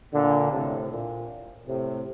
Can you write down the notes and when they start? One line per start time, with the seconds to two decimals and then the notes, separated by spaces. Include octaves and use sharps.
0.12 A#2 D3
0.51 A2 C3
0.89 A#2
1.66 A2 C3